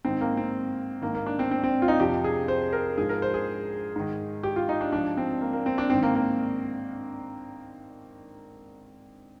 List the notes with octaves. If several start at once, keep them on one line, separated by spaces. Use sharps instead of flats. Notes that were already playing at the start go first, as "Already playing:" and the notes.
G#2 D#3 C4
A#3
C4
G#2 D#3 A#3
A#3
D4
C4
C4
C4
F4
D#4
F2 C3 F3 G4
G#4
C5
A#4
G#2 F3 G#4
A#4
C5
G#4
G#2 D#3
G4
F4
D#4
D4
G#2 F3 D4
C4
A#3
A#3
C4
D4
G#2 D#3 C4
A#3
A#3